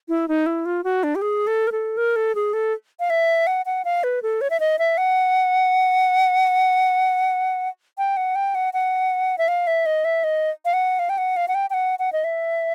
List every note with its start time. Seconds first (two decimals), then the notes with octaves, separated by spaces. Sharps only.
0.09 E4
0.28 D#4
0.46 E4
0.66 F4
0.84 F#4
1.03 D4
1.15 G4
1.22 G#4
1.47 A4
1.67 A#4
1.72 A4
1.97 A#4
2.16 A4
2.35 G#4
2.53 A4
3.00 F5
3.10 E5
3.47 F#5
3.66 F#5
3.85 F5
4.04 B4
4.23 A4
4.41 C#5
4.50 E5
4.60 D#5
4.79 E5
4.98 F#5
7.98 G5
8.17 F#5
8.35 G5
8.55 F#5
8.74 F#5
9.38 E5
9.48 F5
9.67 E5
9.86 D#5
10.05 E5
10.24 D#5
10.65 F5
10.73 F#5
10.99 F5
11.09 G5
11.18 F#5
11.36 F5
11.48 F#5
11.55 G5
11.70 G5
11.74 F#5
11.99 F#5
12.13 D#5
12.24 E5